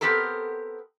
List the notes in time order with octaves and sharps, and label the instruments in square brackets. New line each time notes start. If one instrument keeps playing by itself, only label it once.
[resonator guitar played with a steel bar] B3 C4 G4 A4 A#4